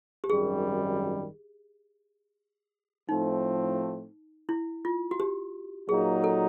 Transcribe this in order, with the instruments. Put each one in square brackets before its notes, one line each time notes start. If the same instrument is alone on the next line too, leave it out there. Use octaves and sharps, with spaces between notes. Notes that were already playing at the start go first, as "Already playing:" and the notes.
[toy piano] G4
[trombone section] G#1 F#2 D#3 G3 [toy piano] G#4
[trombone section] A2 F3 A3 C4 [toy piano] D#4
[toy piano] E4
F4
F#4
G4
[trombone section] A#2 F#3 A#3 D#4 [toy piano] G#4
[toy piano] A4